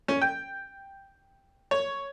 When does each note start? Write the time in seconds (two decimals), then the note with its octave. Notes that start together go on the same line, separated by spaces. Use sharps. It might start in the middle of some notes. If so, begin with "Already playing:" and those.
0.08 C#4
0.22 G5
1.71 C#5